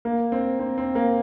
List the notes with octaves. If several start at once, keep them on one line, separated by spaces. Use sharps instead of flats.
A#3
C4
C4
C4
A#3